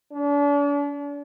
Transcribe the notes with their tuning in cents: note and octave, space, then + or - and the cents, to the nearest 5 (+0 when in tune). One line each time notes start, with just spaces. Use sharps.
D4 -40